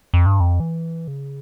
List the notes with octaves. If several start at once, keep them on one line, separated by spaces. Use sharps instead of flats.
F2
G2
F2
E3
C#3